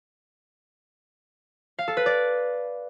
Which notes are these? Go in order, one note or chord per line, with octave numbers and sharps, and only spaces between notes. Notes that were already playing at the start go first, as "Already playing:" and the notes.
F5
A4
B4
D5